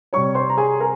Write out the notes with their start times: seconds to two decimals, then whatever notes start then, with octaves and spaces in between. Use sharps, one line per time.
0.13 C3 G3 C#5 C#6
0.35 C5 C6
0.49 A#5
0.57 G#4 G#5
0.80 A#4 A#5